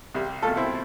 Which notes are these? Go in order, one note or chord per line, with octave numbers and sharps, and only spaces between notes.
C2 C3 G3
C2 B2 A3 F4 A4
C4 E4